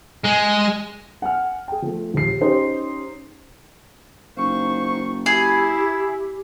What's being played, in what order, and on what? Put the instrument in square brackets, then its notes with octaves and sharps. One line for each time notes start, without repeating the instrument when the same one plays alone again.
[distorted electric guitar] G#3
[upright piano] F#5 G#5 F6
G#4 G5
F3 A3
A#1 D#2 C7
C#4 D#4 G4 G#4 C5
[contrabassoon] F#1 [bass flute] D#4 [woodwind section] C5 F5 C#6
[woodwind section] E4 [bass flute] G4 [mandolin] G#4